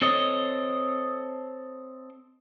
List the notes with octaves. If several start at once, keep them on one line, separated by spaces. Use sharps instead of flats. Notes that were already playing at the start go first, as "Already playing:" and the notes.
C4 A4 C#5 D#5